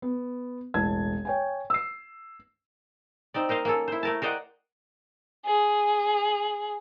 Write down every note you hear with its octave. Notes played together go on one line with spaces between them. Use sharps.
B3
E1 A1 A5 G#6
C#5 G5 G#5
E6 C7
C4 D#4 D5
A#4 C5 D#5 F5
A#3 C#4 A4
E4 C5
A3 A#4 A5
A#4 C5 D5 D#5 F#5 G5
G#4